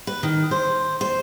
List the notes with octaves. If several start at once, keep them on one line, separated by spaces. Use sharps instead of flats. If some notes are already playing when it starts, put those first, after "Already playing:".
B4
D#3
C5
C5